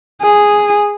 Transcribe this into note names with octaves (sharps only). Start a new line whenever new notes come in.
G#4